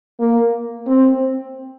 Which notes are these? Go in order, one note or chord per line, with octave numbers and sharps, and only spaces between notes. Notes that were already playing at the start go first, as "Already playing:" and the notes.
A#3
C4